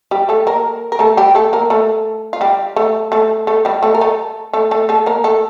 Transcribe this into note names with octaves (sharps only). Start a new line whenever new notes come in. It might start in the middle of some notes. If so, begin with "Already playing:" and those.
G3 G4
A3 A4
A#3 A#4
A#4
A3 A4
G3 G4
A3 A4
A#3 A#4
A3 A4
F4
G3 G4
A3 A4
A3 A4
A3 A4
G3 G4
A3 A4
A#4
A3 A4
A3 A4
A3 A4
A3 A4
A#3 A#4
A3 A4